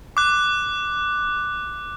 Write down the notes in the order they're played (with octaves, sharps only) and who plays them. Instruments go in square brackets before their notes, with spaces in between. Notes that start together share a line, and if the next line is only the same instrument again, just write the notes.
[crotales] D6 F#6